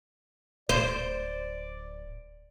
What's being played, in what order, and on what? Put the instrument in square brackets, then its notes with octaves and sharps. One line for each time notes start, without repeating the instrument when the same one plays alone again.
[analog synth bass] D1 [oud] C5 [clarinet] D5